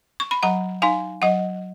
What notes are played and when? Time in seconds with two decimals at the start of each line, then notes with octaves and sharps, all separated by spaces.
0.20 C#6
0.31 B5
0.43 F#3 F#5 A#5
0.82 D#4 F5 G#5
1.22 F#3 D#5 F#5